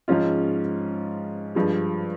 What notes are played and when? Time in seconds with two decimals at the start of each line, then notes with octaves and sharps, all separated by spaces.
0.08 G#2 F3 G#3 C#4 F4
1.55 G2 F3 G#3